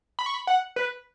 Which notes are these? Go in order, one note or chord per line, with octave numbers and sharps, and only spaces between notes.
B5
C#6
B5
F#5
B4